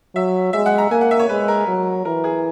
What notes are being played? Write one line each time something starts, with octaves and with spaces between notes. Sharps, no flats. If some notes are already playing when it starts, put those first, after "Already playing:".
F#3 E5
G#3 E5
F#5
A#5
A#3 G#5
F#5
E5
C#5
G#3 B4
A#4
F#3
E3 A#4
G#4